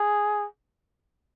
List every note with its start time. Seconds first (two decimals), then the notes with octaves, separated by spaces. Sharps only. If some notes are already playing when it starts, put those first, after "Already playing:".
Already playing: G#4